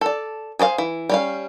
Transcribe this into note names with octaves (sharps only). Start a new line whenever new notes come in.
A4 D5
G#4 C5 D5 F5
E3
G3 C#4 F5